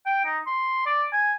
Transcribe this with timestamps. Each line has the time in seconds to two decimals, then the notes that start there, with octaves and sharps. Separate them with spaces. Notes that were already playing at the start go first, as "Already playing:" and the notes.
0.06 G5
0.25 D#4
0.47 C6
0.86 D5
1.13 G#5